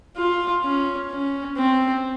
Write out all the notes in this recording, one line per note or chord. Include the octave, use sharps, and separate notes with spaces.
F4
C#4
C#4
C4